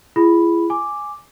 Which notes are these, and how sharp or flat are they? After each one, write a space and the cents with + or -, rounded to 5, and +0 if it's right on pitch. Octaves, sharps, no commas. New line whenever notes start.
E4 +40 G#4 +0 B5 +0
G#5 +0 D6 +0